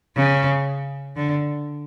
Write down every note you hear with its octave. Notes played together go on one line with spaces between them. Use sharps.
C#3
D3